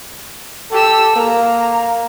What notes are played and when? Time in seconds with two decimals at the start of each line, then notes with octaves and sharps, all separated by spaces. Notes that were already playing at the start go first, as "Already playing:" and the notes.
0.71 G4 A4 E6
1.16 A#3 A#5